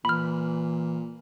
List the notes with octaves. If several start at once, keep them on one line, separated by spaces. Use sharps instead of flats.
A#2 E3 B5 F6